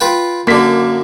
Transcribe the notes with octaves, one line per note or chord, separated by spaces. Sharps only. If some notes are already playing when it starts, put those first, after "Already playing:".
F4 B4 G5
F#2 D3 A#3 B6